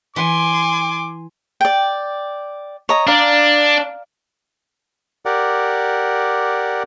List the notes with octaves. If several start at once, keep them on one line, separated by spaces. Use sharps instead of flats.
E3 G#5 C6 D6
D5 G5
C#5 D#5 A#5
D4 D5 F5 A#5
G4 A#4 D5 F#5